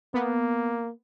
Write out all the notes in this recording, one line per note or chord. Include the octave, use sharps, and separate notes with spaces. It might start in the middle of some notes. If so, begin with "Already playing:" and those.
A#3 B3